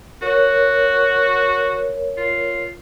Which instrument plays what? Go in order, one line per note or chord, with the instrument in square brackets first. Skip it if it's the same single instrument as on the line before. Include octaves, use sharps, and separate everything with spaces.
[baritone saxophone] F#4 [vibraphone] A#4 C#5
[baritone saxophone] F4